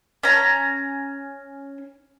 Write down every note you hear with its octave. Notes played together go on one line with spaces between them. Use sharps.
C#4 A#5